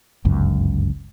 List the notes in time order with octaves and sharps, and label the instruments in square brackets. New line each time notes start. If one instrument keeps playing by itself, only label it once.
[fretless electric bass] G1 C#2 F#2